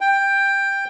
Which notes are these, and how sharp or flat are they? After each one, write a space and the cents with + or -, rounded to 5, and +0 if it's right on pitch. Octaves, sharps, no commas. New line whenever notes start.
G5 +10